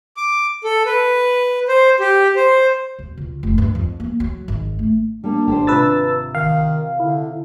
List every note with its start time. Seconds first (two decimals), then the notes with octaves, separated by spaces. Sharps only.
0.17 D6
0.64 A4
0.85 B4
1.68 C5
2.00 G4
2.36 C5
2.99 E1
3.17 C#2
3.43 F1
3.58 G2
3.75 F2
4.00 A#3
4.20 F#3
4.48 G#1
4.79 A3
5.24 G3 A#3 D4
5.47 G#1 G4 A4 C5
5.67 C3 F4 B4 E6 A6
6.35 D#3 F5
6.99 D3 E4